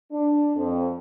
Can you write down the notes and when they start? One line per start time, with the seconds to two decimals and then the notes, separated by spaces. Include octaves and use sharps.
0.12 D4
0.56 F2